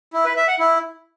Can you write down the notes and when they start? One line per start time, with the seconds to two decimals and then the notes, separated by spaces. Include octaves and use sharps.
0.13 E4
0.25 B4
0.36 E5
0.48 F#5
0.59 E4